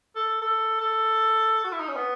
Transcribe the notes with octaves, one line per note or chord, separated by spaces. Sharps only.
A4
A4
A4
F#4
E4
D#4
C#4
B3